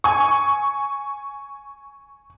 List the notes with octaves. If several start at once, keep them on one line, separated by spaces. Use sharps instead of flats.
G#5 C#6